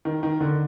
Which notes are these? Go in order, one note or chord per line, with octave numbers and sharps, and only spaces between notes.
D#3
D#3
D3